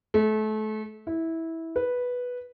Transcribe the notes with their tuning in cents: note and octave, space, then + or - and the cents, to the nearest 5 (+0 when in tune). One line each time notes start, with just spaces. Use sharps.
A3 -30
E4 -15
B4 -5